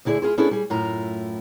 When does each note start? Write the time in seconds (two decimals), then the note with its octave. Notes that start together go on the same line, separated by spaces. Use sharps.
0.05 D2 D3 E4 G#4 D5
0.22 E4 F4 G#4 C5
0.38 B3 C#4 D4 E4 G#4 A4
0.51 G3 G#4
0.70 F#2 A2 E4 F4 A#5